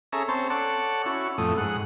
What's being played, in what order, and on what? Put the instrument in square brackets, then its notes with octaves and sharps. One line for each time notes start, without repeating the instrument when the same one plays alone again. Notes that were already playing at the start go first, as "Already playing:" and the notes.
[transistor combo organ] C#4 G#4 A4 E5 A#5
C4 C#4 C5 A5
A4 C#5 D5 F#5 A5
C#4 E4 F#4
F2 A2 A3 D#6
G#2 F#5